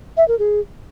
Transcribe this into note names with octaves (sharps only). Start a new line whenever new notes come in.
E5
A#4
G#4